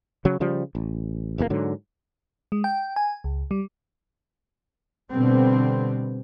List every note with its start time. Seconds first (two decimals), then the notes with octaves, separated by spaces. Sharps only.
0.25 C#3 F#3
0.40 C#3 F3 G3
0.75 A1
1.38 F1 E2 G#2 A#3
1.50 G#2 D3 F#3
2.52 G#3
2.64 G5
2.96 G#5
3.24 C#2
3.51 G3
5.11 B2 D3 G3 B3 C4